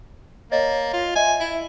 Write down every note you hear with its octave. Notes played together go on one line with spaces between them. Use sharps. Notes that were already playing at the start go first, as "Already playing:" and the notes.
A#3 C#5 D#5 A6
F4
D#5 E5 G#5
E4